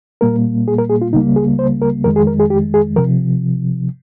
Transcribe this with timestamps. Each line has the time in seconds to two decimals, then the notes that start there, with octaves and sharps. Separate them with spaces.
0.21 A#2 G3 A#3 A#4
0.68 G#4
0.78 A#4
0.90 G#4
1.01 F4
1.13 C#2 C#3 G3 A#3 D#4
1.36 G#4
1.59 C5
1.82 A#4
2.04 F2 D#3 G#3 A#4
2.16 G#4
2.27 A#4
2.40 G#4
2.50 G4
2.74 G#4
2.96 C3 F3 A#4